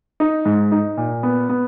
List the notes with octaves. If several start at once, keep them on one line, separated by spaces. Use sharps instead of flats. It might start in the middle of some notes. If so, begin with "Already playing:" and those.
D#4
G#2
D#4
A#2
B3
B3